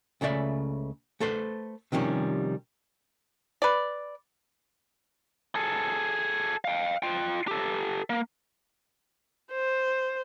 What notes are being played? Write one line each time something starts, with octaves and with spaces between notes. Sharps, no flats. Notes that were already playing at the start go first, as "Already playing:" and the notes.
C#2 C#3 A3 D5 E5
A3 A4 B4 C5
C3 D#3 F3 G3 C#4
B4 D5
G#4 A4
F5 G5
F4 G5
G4 A4
A#3
C5